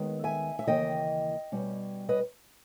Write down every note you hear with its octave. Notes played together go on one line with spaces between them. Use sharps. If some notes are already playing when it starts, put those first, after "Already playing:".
Already playing: D#2 D#3 G#3 B3
E5 G#5
E5
D#2 C#3 E3 A#3 D#5 G5
B2 G3 C#4
B4 D#5